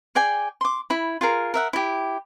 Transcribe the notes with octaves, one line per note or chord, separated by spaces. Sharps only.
G#4 D5 G5 G#5
C6 D6
E4 B5
F4 G#4 A#4
A#4 E5 F#5
E4 G4